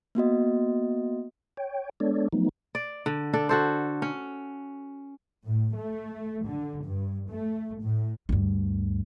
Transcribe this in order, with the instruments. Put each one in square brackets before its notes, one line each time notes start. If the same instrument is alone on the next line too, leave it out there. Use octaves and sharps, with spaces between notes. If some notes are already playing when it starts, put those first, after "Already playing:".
[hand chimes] A#3 B3 F#4 D#5
[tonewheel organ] C#5 G5
G#3 B3 D4 A4 C#5 D5
F3 F#3 A3 B3 D#4
[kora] D5
D3
D4 A4
F#4 A4 C5
C#4
[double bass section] A2
A3
D3
G2
A3
A2
[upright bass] D2 G2